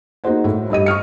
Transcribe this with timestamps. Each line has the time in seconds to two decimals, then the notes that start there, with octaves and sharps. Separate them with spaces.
0.24 A#3 D#4 F#4 G#4 C5 F#5
0.44 A2
0.70 G2 G4 D#5 D#7
0.86 C#6 D#6 F6 C#7